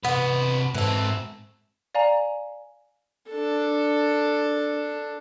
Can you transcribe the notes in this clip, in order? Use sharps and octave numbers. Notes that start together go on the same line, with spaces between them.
C3 B3 B4
G#2 E3 C4 A4
D5 F5 G#5 A#5
D4 A4